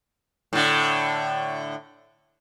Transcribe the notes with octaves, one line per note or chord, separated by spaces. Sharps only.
A2 D3